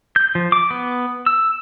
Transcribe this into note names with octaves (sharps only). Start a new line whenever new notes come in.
G6
F3
D6
B3
E6